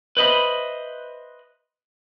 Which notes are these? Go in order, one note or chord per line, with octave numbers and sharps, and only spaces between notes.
B4 C5 D#5 E5 B5